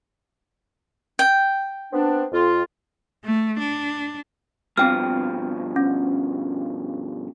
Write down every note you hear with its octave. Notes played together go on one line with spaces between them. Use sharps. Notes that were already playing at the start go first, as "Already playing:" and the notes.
G5
B3 C4 D4
F2 F4
A3
D4
G2 B2 F3 C4 G5 F6
C#4